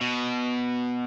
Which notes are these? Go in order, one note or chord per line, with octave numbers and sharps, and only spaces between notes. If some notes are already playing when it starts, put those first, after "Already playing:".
B2